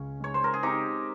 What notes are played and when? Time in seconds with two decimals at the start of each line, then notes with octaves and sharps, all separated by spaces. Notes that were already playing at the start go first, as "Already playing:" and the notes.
Already playing: C#2 C#3 C#4
0.20 G#3 C#5
0.34 C5
0.44 A#4
0.54 G#4
0.63 C4 D#4 G4